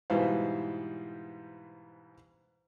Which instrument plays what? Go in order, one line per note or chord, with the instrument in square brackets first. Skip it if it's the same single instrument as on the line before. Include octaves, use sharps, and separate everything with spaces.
[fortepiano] G#2 B2 E3 G3 C5 F5